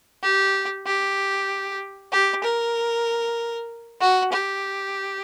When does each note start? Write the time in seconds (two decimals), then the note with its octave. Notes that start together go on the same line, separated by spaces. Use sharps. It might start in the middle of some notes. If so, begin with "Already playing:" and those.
0.23 G4
0.87 G4
2.12 G4
2.44 A#4
4.01 F#4
4.32 G4